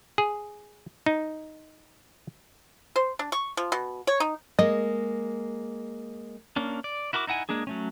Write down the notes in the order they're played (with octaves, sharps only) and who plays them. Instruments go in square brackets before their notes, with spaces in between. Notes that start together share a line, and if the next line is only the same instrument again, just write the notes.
[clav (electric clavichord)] G#4
D#4
[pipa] C5
D4
C#6
F3
B2
C#5
D#4
[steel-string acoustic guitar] G#3 A#3 [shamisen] D#5
[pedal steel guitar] A#3 C#4 D4
D5
E4 F#4 A#4 B5 D6
D#4 E4 F#5 G#5
G#3 A#3 D4 G#4
F#3 A3 C#4